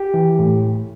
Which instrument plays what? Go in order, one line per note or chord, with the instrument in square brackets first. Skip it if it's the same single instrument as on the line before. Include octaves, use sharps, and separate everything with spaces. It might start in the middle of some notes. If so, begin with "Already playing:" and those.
Already playing: [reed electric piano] G4
E3
A2